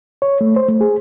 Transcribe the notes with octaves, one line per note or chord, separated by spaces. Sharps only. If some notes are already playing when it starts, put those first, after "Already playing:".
C#5
A3
C5
A3
G#4